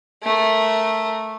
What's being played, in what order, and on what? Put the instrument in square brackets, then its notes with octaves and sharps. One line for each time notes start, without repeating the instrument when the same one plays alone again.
[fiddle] A3 A#4